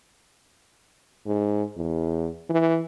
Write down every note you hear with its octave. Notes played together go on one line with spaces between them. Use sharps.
G#2
E2
E3